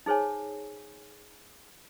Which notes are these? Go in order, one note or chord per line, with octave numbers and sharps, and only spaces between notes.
D#4 G#4 C5 C#5 G#5